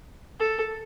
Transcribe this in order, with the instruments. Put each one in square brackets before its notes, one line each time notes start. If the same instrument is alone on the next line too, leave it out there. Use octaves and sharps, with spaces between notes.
[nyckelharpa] A4